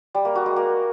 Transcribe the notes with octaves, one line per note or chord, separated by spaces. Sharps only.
G3
A#3
F#4
G#3
A#3